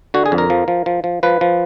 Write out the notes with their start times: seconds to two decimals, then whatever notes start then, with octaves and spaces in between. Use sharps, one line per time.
0.14 D3 F#4
0.26 G#4
0.32 F2
0.38 A#4
0.50 F3
0.68 F3
0.86 F3
1.04 F3
1.23 F3 B4
1.41 F3